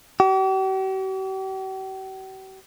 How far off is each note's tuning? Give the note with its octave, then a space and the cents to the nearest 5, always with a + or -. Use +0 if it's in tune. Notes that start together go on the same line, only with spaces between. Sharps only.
G4 -45